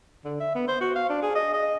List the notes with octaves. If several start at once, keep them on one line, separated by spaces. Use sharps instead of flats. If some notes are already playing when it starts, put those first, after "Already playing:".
D3
E5
B3
C5
F#4
F5
D4
G#4
D#5
D#5